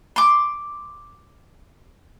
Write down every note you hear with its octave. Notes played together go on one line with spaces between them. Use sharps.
C6 D6